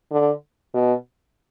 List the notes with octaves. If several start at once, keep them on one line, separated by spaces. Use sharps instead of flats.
D3
B2